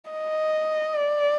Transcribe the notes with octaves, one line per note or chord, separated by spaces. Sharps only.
D#5
D5